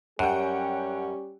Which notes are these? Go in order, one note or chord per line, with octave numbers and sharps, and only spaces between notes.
F#2 G3 C#4 G4 F#5 G5